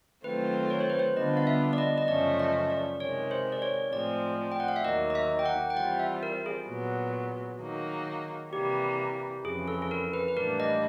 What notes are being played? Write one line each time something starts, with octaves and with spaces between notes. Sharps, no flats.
D#3 F#3 A3 C4 F4 B4
C#5
C5
B4
C5
D3 G3 B3 D4 F4 D#5
F5
E5
D5
D#5
D#5
F#2 C#3 F3 A3 C#4 D5
D#5
D5
C3 D#3 G#3 C#5
C5
D5
C#5
A2 F3 G#3 C4 D5
G5
F#5
F5
E5
D#2 D#3 F#3 A#3 D#5
D#5
E5
G5
F#5
G5
E3 G3 C4 F4 F#5
E5
A#4
G#4
A#2 F#3 B3
D#3 F#3 A#3 D#4
C3 E3 G3 A#3 G4
F2 C#3 E3 G#4
A4
A4
A#4
B4
B4
A2 E3 G3 A#3 D4 A#4
D#5